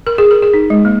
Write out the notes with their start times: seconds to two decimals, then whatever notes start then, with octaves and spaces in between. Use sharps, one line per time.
0.07 A#4
0.18 G#4
0.31 A#4
0.42 G#4
0.54 D#4
0.70 G#3
0.85 A#3